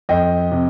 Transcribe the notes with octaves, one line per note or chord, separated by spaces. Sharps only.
F2 D#5 G5
C3